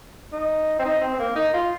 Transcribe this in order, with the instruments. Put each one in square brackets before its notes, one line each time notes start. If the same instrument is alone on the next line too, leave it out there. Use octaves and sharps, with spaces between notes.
[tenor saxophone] D#4
C4
D#4
C4
C4
A#3
D#4
F4